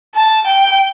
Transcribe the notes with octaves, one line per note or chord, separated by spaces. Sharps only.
A5
G5